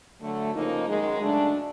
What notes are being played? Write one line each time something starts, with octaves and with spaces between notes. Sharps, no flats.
D3 F#3 A3
C#3 F3 A#3 D#4
F#2 D#3 G#3
C#3 F#3 A3 D4